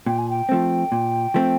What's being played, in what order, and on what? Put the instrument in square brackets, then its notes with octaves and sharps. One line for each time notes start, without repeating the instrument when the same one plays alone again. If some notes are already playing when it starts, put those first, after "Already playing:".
[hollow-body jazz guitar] A#2 [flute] G5
[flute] G#5
G5
[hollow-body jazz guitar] F3 A3 C4
A#2
F3 A3 C4